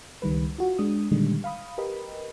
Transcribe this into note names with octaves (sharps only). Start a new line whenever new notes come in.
C#2 D#3 G3 B4
F4 F#4
G#3 D4 D#6
A#2 D3 D#3 G3 G#3
F5 B5 D#6
G4 A#4 B4 D#5 B5